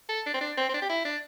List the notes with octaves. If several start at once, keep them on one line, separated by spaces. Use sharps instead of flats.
A4
D4
C4
D4
C4
C4
D4
G4
E4
D4